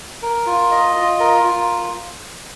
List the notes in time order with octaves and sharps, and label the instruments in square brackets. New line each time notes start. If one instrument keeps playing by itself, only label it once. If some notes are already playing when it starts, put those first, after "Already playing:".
[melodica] A#4
F4
D#5
F4
A#4
F4